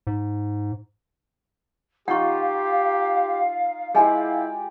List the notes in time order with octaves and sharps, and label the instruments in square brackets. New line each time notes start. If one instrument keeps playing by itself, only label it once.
[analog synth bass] G#2
[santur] D#4 F4 [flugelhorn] G4 [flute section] F5 [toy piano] F#5 C#6
[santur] G#3 G4 D5 [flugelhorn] E4 [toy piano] G#4 D#5 G#5